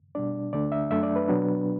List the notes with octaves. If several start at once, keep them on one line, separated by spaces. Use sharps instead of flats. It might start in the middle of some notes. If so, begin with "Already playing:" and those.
B2 G3 D4 D5
D2 D3 A3 D4 D5
E5
F#2 F#3 A3 D4 E5
D5
B4
B2 F#3 B3 D4